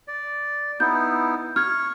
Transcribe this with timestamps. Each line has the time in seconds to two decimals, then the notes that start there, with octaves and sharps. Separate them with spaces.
0.08 D5
0.80 B3 D#4 E4 G6
1.56 C#6 F6 G#6